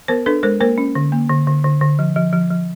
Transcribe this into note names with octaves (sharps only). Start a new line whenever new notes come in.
B3 A#4 C5
D4 A4 B4
G#3 A#4 C5
A#3 A#4 C5
C#4
D3
A#3
D3
D3
D3
D3
F3
F3
F3
F3